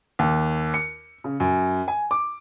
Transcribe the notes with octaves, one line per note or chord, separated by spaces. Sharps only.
D#2
C#7
C#3
F#2
G#5
D6